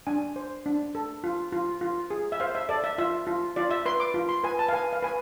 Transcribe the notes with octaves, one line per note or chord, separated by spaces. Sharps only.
D4 G#5
C5
D4
A4
F4
F4
F4
G#4
E5
C5 F5
E5
A4 D5
E5
F4 E5
F4
F4 D5
E5
B4 C6
D6
F4
C6
B4 G#5
A5
F5
B4 G#5
F5
B4 G#5